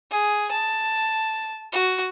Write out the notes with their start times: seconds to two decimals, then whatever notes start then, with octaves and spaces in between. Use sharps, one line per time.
0.11 G#4
0.51 A5
1.73 F#4